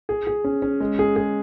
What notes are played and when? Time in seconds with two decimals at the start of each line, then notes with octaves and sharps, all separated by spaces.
0.09 G#4
0.27 G#4
0.44 C#4
0.62 C#4
0.80 G#3
0.99 G#4
1.16 G#4